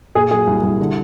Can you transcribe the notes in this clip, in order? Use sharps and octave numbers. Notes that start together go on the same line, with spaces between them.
A#2 G#4
F#3 G#4
C2
C2
D3